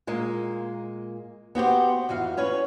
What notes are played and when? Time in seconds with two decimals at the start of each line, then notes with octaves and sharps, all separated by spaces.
0.07 A#2 G#3 A#3
1.55 B3 F#4 G4 C5
2.09 F2 E3 F#4 F5
2.37 C#4 B4 C#5